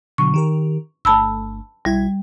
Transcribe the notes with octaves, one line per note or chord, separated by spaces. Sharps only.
B2 D3 F#3 C#6
D#3 G4 A#4
G1 A3 A5 B5 E6
B1 G3 E4 G#6